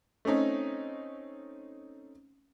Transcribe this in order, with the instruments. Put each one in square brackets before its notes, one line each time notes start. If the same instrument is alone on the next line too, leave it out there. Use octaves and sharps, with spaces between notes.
[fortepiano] A3 C4 C#4 D#4